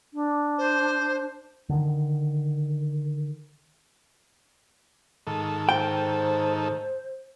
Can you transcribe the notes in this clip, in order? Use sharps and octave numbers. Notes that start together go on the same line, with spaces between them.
D4
C5
D3 D#3
G#2 D#3 A4
C5 G5